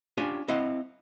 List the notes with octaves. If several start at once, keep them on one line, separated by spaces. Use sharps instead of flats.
C#4 D4 F4 G4 C#5 G#5
C4 E4 D#5 F5 F#5